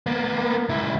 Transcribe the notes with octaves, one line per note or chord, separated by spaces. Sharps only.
A#3 B3
C#2 E4